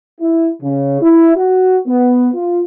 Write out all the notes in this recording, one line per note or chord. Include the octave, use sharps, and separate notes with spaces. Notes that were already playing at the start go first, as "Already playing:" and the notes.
E4
C#3
E4
F#4
B3
F4